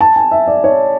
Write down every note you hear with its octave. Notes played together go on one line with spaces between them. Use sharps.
A5
G#5
E5
D5
C#5